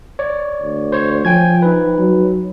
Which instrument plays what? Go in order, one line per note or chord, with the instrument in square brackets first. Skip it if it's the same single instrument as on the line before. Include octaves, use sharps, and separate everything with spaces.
[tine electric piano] C#5 D5
[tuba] D2
[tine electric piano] C5 C#5
[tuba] F3 [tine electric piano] G5 G#5 G#6
[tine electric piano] D#4 B4
[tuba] F#3